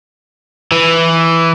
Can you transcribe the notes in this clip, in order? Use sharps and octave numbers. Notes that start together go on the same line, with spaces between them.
E3